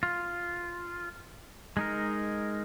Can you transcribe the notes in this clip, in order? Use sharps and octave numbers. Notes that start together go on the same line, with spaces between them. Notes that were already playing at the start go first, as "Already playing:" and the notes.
F4
G#3 D#4 A#4